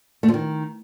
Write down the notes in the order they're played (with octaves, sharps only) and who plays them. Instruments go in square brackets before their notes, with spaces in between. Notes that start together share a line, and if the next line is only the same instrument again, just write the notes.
[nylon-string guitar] A3
F3
D#3